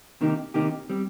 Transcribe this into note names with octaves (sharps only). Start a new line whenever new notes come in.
C3 D#3 A#3 D#4 G4
C3 D#3 A#3 D#4 G4
G3 C4